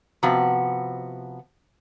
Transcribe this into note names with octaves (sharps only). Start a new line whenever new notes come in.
C3 F3 B3 F#4